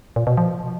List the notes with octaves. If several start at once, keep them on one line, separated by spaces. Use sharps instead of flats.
A#2
B2
F3